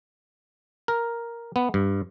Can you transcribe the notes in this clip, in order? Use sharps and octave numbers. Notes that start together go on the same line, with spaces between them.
A#4
B3
G2